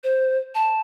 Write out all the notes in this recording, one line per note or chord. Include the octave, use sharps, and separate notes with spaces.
C5
A5